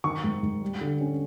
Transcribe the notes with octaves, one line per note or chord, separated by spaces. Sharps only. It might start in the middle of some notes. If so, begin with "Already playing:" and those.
D#3 C#6
G#2
G#2
G3
D3
C#4